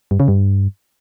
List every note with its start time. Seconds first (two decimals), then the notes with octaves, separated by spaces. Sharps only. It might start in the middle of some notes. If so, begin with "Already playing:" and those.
0.11 G2
0.20 C#3
0.28 G2